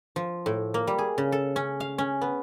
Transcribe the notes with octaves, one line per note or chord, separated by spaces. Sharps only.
F3
A2
A#3
G3
G#4
C#3
A4
C#4
F5
C#4
B3